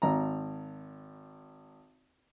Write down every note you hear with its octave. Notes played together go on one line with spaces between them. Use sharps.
G#1 A#5